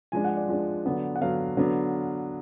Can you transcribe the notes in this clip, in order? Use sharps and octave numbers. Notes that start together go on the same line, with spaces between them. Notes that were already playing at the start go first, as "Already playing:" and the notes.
F3 G#3 D4 G#5
F#5
D5
F3 G#3 D4
D3 F#3 B3 D4
F#5
D3 F#3 B3 D4 F5
D3 F#3 B3 D4